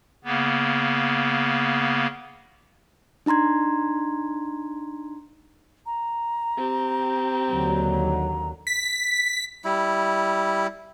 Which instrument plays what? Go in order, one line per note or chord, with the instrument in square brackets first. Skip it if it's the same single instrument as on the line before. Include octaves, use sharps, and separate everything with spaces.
[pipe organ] C#3 A#3 B3
[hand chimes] D4 D#4 A#5 C6 G#6
[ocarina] A#5
[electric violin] C4 G4
[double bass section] D#2 D3 F#3
[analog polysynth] B6
[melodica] G3 E4